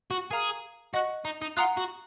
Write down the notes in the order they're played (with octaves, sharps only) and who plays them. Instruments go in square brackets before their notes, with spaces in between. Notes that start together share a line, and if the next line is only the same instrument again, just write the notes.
[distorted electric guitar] F#4
[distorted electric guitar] G#4 [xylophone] A#4 F5 A#5 F6
[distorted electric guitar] F#4 [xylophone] D#5 F#5 C#6 F#6
[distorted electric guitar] D#4
D#4
[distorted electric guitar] F4 [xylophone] F#5 A#5 D#6 F#6
[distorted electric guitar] F#4